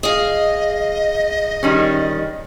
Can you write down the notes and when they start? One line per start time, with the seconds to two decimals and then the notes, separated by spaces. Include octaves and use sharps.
0.03 G#4 D#5 F5
1.63 D#3 G3 C#4